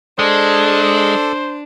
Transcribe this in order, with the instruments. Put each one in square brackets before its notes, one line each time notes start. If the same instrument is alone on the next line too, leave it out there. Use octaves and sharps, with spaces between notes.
[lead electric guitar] G#3 [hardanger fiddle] D4 [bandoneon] A4 D5 [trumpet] C5